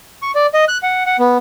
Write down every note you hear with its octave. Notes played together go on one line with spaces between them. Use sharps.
C#6
D5
D#5
F#6
F#5
F#5
B3